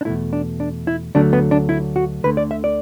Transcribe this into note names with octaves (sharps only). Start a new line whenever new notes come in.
D4
E2 B2 A3 E4
D4
D4
E4
D2 D3 F#3 A3 D4
B3
D4
E4
F#4
D2 D3 A3 B4
D5
E5
D5